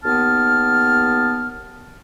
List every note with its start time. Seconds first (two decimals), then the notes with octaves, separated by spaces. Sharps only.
0.04 D#2 B3 A5 F6